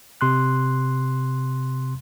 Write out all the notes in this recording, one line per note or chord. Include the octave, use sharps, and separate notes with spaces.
C3 C6 F#6